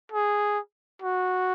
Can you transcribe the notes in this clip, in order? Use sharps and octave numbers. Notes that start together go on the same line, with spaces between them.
G#4
F#4